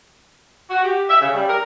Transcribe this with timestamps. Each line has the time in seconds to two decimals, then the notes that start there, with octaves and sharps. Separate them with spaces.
0.69 F#4
0.84 G4
1.09 E5
1.21 C#3
1.34 G3
1.48 A#4